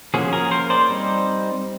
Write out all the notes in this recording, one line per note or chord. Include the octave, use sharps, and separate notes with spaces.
F3 A#3 C#4 F#4 G#4
G#4 A#4
A#4 C5
C5 D5
G3 C4 D#4